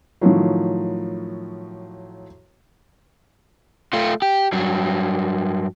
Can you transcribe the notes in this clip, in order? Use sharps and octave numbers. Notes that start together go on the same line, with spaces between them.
A2 D#3 F3 F#3
A3 F4
G4
G2 F#3